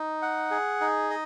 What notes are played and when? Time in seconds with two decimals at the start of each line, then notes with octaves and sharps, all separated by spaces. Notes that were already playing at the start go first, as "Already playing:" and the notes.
Already playing: D#4
0.22 F#5
0.51 G#4
0.81 D#4
1.10 D#5